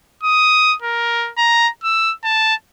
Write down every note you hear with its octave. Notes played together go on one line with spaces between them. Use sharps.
D#6
A#4
A#5
E6
A5